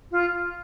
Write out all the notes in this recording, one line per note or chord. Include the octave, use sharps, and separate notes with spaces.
F4